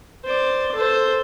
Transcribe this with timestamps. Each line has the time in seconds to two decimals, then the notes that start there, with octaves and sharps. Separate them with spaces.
0.25 C5 D5
0.75 A4 C5